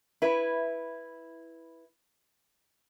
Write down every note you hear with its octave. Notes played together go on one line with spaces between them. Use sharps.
E4 B4